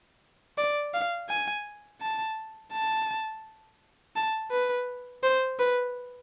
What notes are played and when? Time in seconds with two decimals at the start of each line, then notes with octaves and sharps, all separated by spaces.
0.58 D5
0.94 F5
1.29 G#5
2.01 A5
2.73 A5
4.16 A5
4.51 B4
5.23 C5
5.59 B4